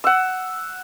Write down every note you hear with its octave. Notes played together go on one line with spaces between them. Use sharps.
F#5 E6